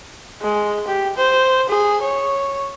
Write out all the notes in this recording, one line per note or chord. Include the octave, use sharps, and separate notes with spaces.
G#3
G4
C5
G#4
C#5